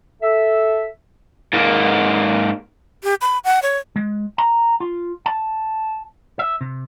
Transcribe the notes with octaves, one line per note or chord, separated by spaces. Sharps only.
A4 E5
G#2 A#3
G4
B5
F#5
C#5
G#3
A#5
F4
A5
E5
C3